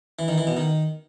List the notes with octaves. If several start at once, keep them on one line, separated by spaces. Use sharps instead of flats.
E3
D#3
E3
B2
D#3